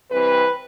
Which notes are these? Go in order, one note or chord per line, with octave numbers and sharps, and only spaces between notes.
C3 E3 G3 C4 B4